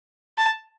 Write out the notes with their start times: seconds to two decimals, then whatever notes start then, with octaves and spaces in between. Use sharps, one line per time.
0.38 A5